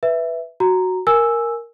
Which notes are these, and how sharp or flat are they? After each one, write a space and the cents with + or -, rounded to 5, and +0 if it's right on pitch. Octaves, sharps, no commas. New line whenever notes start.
B4 +0 E5 +0
F#4 +0 A#5 -5
A#4 +0 G#5 +0 E6 +0